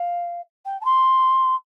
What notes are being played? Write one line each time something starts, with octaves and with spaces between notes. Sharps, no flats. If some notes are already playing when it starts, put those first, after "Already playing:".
Already playing: F5
G5
A5
C6